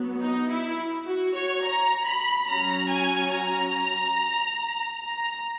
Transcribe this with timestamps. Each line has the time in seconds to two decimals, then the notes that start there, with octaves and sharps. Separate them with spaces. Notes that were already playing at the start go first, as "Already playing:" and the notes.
Already playing: F#3 B3
0.21 D#4
0.50 E4
1.06 F#4
1.35 C#5
1.64 A#5
2.06 B5
2.48 F#3 C#4 A#5
2.90 G#5
3.33 A#5
5.03 A#5